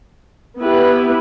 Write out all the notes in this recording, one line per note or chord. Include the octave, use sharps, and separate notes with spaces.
B3 E4 G4 B4